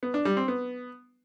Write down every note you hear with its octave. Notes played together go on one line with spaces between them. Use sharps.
B3
D4
G3
C4
B3